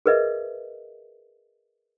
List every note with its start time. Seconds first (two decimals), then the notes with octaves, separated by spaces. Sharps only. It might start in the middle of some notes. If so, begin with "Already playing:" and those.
0.06 G#4 A#4 B4 D#5 E5